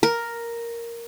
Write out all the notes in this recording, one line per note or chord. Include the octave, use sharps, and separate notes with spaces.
A#4